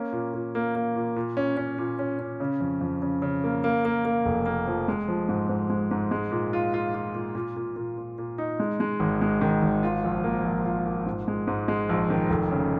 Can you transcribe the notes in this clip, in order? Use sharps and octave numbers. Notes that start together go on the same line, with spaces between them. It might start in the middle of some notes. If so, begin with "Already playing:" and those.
Already playing: A#3 C#4
A#2
A#2
A#3
A#3
A#2
A#2
C#4
C#4
A#2
C#4
C#4
C#3
F2
F2
C#3
C#3
A#3
A#3
A#3
A#3
F1
A#3
F3
G#3
F3
G#2
G#2
G#3
G#2
G#3
A#2
F4
F4
F4
A#2
A#2
A#2
A#2
A#2
A#2
D#4
G#3
G#3
G#1
G#3
D#3
G#1
F4
A#1
A#3
A#1
F4
A#2
G#2
G#3
G#2
G#3
A#1
D#3
F1
C#3